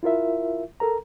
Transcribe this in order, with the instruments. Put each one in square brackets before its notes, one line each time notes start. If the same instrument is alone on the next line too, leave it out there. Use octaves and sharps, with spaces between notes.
[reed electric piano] E4 F4 A#4 E5
A4 A#4 A#5